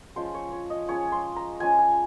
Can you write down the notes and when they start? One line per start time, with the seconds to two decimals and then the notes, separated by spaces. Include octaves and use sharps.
0.16 F3 G#3 C#4 C5
0.34 C#5
0.52 C#5
0.70 D#5
0.88 F3 G#3 C#4 C#5
1.12 C6
1.36 A#5
1.60 F3 G#3 C#4 G#5
1.79 G#5